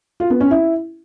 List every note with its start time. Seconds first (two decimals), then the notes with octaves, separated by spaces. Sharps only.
0.20 F4
0.30 B3
0.41 C#4
0.51 E4